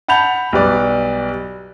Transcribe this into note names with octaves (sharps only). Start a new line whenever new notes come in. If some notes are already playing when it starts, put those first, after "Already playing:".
F#5 A5 B5 G6 F7
B1 G3 B4 D5